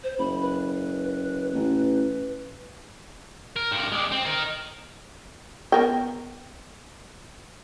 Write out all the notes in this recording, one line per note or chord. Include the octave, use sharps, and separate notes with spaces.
C5
F#1 B5
B4
A1
A#4
G2 A#4
G#3 G4
C4
D#4 A#4
B3 A#4 G5